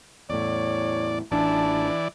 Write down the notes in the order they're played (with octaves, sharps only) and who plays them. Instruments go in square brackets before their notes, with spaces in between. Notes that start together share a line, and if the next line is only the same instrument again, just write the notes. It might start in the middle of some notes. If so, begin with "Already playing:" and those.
[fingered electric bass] E2 A2 [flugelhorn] C#5 [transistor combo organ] D5
[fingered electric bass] A1 D4 [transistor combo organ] E3 D5 [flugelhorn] A5